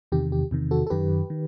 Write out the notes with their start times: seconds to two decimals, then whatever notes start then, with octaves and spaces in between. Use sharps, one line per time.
0.12 E2 C3 D#3 G4
0.32 G4
0.51 E2 C3 D#3
0.71 F#4 A4
0.87 A4
0.90 F#2 D#3 G4 B4
1.30 D#3